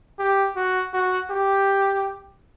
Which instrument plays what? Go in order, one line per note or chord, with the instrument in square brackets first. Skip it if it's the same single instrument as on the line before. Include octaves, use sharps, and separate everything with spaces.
[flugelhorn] G4
F#4
F#4
G4